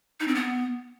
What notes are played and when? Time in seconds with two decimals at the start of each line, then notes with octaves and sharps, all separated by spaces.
0.20 D#4
0.28 C4
0.35 B3